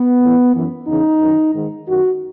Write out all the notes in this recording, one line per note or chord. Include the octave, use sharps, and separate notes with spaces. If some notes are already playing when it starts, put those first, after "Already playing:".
Already playing: B3
A2
E3
F#2 E3
E2 C#3 E3 D#4
F#2 D#3
G#2 D#3
F#2 D#3 F#4